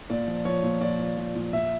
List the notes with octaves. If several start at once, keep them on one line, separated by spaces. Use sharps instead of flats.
A#2 D5
F3
F3 C#5
A#2
A#2 D5
F3
F3
A#2
A#2 E5